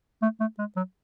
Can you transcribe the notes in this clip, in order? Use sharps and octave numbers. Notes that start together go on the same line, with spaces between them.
A3
A3
G#3
F#3